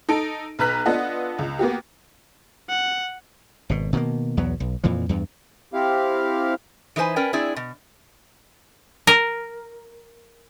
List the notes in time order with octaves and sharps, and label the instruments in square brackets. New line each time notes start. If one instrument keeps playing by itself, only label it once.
[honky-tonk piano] D#4 A4 D7
B1 B4 A#5 F#6 B6
B3 D4 F4 A4 D#5 F#5
C#2
A#3 B3 F#4 G4
[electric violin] F#5
[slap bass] G#1 B2
B2 D#3 A3 A#3
B1 E2 F#3 B3
B1
F2 A#2 E3 F3
E2 G2
[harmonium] C4 E4 G4 F5
[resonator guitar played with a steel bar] E3 D#4 B4 C5 G#5
C#4 A#4 B4 D5 G5
C4 D4 E4 G#4 D5
B2
[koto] A#4